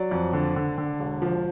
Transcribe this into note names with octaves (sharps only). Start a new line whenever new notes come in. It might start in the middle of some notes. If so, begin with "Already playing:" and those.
Already playing: F#3 D5
F2
D3
D3
D3
E1
F3